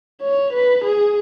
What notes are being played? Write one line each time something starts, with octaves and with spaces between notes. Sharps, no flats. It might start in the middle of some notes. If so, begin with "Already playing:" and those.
C#5
B4
G#4